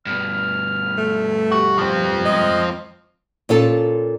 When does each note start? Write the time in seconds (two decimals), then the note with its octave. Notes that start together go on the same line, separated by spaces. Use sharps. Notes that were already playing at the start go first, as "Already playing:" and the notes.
0.06 G2 B2 F6
0.97 A3
1.52 F#4 G4
1.79 F3 C4
2.25 G#3 D#5
3.49 A#2 C#4 F4 A4